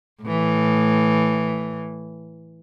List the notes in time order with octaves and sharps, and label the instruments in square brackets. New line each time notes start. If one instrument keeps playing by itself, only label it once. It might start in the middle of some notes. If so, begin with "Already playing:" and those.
[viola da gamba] A2 E3